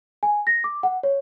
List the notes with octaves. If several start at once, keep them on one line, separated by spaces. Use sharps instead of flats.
G#5
A#6
D6
F#5
C#5